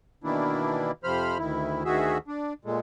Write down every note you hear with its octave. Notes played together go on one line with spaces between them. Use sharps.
B2 D#3 E3 A#3 D4 E4
F2 C3 F3 C5 B5 F6
D2 D#3 E4
D2 D#3 F#4 G#4 E5
D4
A#2 G#3 A3